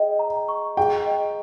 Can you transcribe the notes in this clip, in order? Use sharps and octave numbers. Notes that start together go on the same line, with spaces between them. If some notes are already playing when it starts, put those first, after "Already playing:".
Already playing: G#4 D#5 G5
A#5
C#6
G#4 G5
D#5